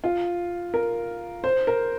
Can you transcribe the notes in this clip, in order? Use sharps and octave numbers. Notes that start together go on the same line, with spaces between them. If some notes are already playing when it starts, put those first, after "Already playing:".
F4
A#4
C5
A#4